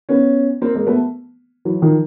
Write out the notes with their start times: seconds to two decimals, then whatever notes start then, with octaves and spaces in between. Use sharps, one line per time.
0.09 B3 C#4
0.61 A#3 C4
0.75 G#3 A#3
0.87 A3 B3
1.65 E3 F#3
1.82 D#3 F3